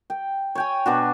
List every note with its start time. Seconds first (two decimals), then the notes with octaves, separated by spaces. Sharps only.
0.10 G5
0.55 C#5 G5 G#5
0.86 B2 D4 F#4